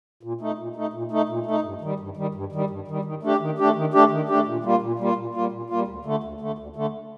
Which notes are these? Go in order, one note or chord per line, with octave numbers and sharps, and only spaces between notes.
A#2
A3 D#4
A#2
A3 D#4
A#2
A3 D#4
A#2
A3 D#4
G2
D#3 G3
G2
D#3 G3
G2
D#3 G3
G2
D#3 G3
D#3
A3 D4 G4
D#3
A3 D4 G4
D#3
A3 D4 G4
D#3
A3 D4 G4
A#2
G3 A#3 F4
A#2
G3 A#3 F4
A#2
G3 A#3 F4
A#2
G3 A#3 F4
D2
D3 A3
D2
D3 A3
D2
D3 A3